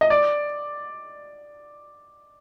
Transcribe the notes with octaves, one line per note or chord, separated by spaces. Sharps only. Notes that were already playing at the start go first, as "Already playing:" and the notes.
D#5
D5